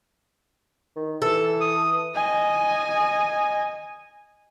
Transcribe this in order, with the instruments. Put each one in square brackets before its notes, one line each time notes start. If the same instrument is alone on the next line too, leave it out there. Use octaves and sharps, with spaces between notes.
[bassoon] D#3
[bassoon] E3 [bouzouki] A4
[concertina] D#6
[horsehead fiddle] D#5 G#5